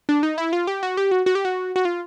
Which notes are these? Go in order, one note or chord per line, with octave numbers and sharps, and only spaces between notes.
D4
D#4
E4
F4
G4
F#4
G4
F#4
F#4
G4
F#4
F#4
F4